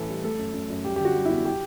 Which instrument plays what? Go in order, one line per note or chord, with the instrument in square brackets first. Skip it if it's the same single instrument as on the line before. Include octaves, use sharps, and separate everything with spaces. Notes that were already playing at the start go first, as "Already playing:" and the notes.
Already playing: [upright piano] A1 A2 E3 A4
G3
A3 A4
F#2
F#2
F#2
G3 G4
D3 G4
F#4
G3
E4
E2
G4